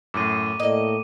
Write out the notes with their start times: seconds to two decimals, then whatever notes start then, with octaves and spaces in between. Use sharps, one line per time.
0.14 F#2 A2 D6 D#7
0.60 A2 A#3 D#5